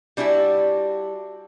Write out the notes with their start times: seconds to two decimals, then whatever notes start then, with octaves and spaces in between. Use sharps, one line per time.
0.17 G3 D4 E4 F#4 G4